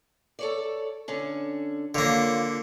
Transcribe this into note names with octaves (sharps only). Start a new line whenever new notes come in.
A4 C#5 D5
D3 C#4 D4
F2 D3 A#3 F4 C#5